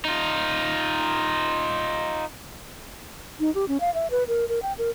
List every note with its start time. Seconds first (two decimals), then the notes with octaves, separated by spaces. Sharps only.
0.05 D#4 F4
3.40 D#4
3.55 G4
3.68 C#4
3.80 F5
3.94 E5
4.11 B4
4.28 A#4
4.49 A#4
4.62 G5
4.78 A#4